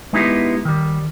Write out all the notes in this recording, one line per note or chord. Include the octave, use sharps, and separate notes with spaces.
G#3 B3 D#4 E4 G4
D#3 G3